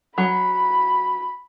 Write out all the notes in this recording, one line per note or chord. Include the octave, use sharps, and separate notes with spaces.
F#3 B5